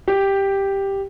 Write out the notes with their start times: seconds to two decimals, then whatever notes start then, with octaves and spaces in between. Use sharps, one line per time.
0.08 G4